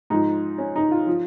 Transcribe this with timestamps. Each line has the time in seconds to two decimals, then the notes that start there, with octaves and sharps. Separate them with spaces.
0.10 G#2 F3 D#4
0.58 C#4
0.76 D#4
0.91 F4
1.07 F3